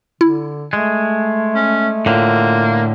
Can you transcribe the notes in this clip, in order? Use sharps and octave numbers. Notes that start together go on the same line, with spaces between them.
D3 E4
G#3 A3
C#4
A2 D3 A#3 F4